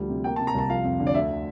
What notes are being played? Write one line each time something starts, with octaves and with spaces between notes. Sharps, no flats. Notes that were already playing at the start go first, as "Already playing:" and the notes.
Already playing: D2 F3 G3
C3
A#3 G5
A5
C3
A#5
C2 A5
F3 F5
F2
D3
D5
D2 E5
D3